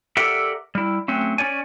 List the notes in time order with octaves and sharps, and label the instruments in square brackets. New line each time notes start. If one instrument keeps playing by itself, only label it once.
[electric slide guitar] G4 A4 A#4 D5 E5 F#5
G3 E4
F#3 A3 C4 C#4
C#4 F4 C#5 D5 G#5